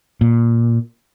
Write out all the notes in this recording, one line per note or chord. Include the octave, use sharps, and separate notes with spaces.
A#2